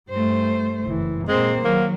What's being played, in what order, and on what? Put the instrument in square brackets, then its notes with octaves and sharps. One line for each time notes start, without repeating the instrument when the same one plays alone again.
[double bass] G2 [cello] A3 C5
[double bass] F#1 E3
[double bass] A#2 A#3 [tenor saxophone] G#3 [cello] C4 C5
[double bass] D#3 [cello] F#3 [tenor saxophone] A#3